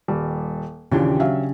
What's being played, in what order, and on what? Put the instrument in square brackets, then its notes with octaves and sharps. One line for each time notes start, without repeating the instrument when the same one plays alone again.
[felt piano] D#1 G3
[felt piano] D#2 A#2 E3 [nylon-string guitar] C#3 D4 G4
[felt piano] F#3 E5 F5